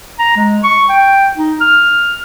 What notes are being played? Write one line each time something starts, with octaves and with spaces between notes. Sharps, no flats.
A#5
G#3
C#6
G5
D#4
F6